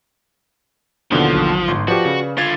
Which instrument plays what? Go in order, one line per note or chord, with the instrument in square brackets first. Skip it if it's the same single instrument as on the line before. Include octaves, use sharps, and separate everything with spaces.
[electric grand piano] D#2 B2 D3 [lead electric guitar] F3 [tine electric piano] D4 E4 F#5
[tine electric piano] A1 D#3 F#3
[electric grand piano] G1 [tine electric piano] G#2 C6
[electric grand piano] F3 G4 [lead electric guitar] F#4 [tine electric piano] B4 D5 F5
[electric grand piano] C#3
[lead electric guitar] D3 F4 [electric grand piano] G#6 A6